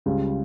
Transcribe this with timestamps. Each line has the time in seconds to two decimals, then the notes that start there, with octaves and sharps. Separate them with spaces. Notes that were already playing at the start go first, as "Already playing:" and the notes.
0.06 C#2 C#3 G3